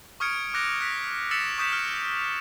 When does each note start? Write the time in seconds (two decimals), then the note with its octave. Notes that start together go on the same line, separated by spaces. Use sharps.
0.20 C#6 D#6 F6 G#6 C#7 D7
0.54 D6 F#6 A#6 D7 F7
0.80 F#6 A#6 B6
1.31 E6 A6 B6 C#7 E7 F7
1.58 C#6 D#6 G6 B6 E7
1.72 F6